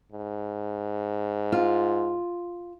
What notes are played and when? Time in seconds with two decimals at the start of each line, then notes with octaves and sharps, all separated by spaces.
0.12 G#2
1.52 F4